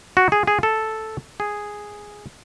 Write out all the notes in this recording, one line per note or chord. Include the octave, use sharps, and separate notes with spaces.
F#4
G#4
G#4
A4
G#4